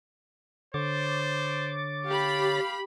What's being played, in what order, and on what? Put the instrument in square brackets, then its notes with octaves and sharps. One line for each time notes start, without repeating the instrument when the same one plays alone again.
[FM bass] D3 [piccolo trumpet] C5 [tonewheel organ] C#5 D6 A6
[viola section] G4 B5 [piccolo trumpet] F5